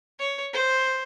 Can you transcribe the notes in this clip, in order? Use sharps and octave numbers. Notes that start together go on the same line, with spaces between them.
C#5
C5